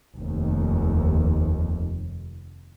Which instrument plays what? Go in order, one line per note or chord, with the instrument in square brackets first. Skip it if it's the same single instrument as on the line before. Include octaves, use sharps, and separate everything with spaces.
[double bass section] F1 D#2